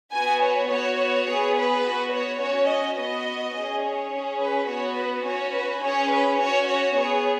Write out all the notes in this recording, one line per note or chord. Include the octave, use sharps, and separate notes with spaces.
B3 F#4 G#5
C#5
B3 F#4 C#5
C#5
B3 G#4
B4
B3 F#4
C#5
C#4 F#4 C#5
D#5
B3 F#4 D#5
C#4 G#4
C#5
C#4 G#4
B4
B3 F#4 C#5
B4
C#4 F#4 C#5
B4
C#4 G#4 C#5
B4
C#4 F#4 C#5
C#5
B3 G#4 C#5